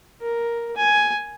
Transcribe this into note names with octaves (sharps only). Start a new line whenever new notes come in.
A#4
G#5